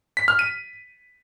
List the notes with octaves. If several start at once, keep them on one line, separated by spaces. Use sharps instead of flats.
B6
F6
D#7